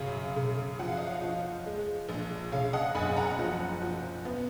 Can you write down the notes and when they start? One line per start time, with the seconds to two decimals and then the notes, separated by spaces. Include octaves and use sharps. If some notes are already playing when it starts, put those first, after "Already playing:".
Already playing: F#2 C#3 C#5 F5
0.36 C#3
0.79 F3 F#5
0.88 F5
0.97 D#5
1.07 C#5 F5
1.22 F3
1.66 G#3
2.09 A#1
2.52 C#3 C#5 F5
2.73 D#5 F#5
2.95 F#1 G#5 B5
3.17 F#5 A#5
3.39 F3
3.82 F3
4.25 B3